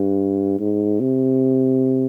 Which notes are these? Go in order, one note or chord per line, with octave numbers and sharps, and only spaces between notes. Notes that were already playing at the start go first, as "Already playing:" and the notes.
Already playing: G2
G#2
C3